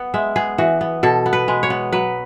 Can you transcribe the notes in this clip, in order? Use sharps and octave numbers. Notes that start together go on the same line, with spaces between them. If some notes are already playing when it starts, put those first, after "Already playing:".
Already playing: B3 F#5
G#3 E5
B3 G#4
E3 F#4
B3
B2 A4
B3
B4
G#3
C#5
B3
F#3 B4